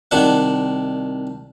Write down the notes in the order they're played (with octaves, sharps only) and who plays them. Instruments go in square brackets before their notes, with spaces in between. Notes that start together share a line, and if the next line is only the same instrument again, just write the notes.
[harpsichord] C2 D#3 D4 F#5